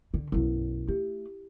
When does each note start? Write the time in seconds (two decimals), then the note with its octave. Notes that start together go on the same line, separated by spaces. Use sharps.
0.14 D3
0.32 B1 F#2 E4
0.89 A3 G4